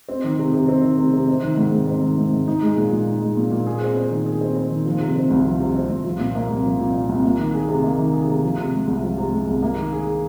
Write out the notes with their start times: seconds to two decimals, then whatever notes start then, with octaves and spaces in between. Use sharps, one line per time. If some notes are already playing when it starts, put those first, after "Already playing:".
0.09 C4
0.24 D#3
0.39 C3
0.54 C3
0.69 C4
0.83 D#3
0.98 C3
1.13 C3
1.29 C4
1.42 D#3
1.58 G#2
1.72 G#2
1.88 C4
2.02 D#3
2.17 G#2
2.32 G#2
2.48 D#4
2.62 G#3
2.77 A#2
2.91 A#2
3.07 D#4
3.22 G#3
3.37 A#2
3.52 A#2
3.67 G#4
3.81 C4
3.96 C5
4.11 D#3
4.26 G#4
4.41 C4
4.56 C5
4.71 D#3
4.85 F3
5.00 C3
5.16 C4
5.30 C2
5.45 F3
5.60 C3
5.75 C4
5.89 C2
6.05 F3
6.19 A#2
6.35 A#3
6.50 C2
6.64 F3
6.79 A#2
6.94 A#3
7.09 C2
7.24 A#3
7.38 D#3
7.54 G#4
7.69 C3
7.84 A#3
7.98 D#3
8.13 G#4
8.28 C3
8.43 F3
8.58 C3
8.73 G#3
8.87 C2
9.03 F3
9.17 C3
9.33 G#3
9.47 C2
9.63 A#3
9.77 D#3
9.93 G#4